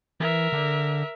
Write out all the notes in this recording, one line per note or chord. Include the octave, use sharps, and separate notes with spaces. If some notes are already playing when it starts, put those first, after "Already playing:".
E3 A#4 E5
D3